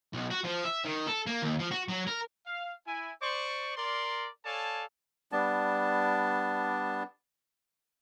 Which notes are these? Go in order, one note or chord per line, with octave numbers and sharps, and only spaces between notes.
B1
F#4
F3
E5
D#3
A4
A#3
D#2
F3
F#4
F#3
A#4
F5
E4 G#5
C5 D5 C#6
A#4 D5 C6
A4 C#5 D5 F5 G#5 A5
G3 B3 D4 A5